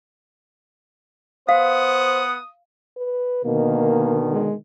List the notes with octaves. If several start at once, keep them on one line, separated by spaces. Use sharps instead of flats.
B3 C5 F5 F#5 D#6
B4
B2 D3 D#3 A#3
G#3